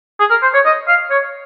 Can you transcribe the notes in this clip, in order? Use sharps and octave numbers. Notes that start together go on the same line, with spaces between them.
G#4
A#4
C5
C#5
D#5
F5
C#5